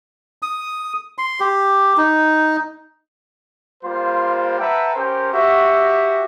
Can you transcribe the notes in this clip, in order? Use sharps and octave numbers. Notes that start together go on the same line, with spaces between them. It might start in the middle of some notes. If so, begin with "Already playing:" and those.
D#6
C6
G4
D#4
G3 A#3 F4 C5
B4 E5 F#5 G5 A5 A#5
C#4 G4 A#4 C5
F#4 G4 E5